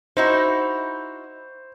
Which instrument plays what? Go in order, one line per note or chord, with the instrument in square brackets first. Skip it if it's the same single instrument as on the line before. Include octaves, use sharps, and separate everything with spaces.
[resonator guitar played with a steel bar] D#4 E4 F#4 [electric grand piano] C5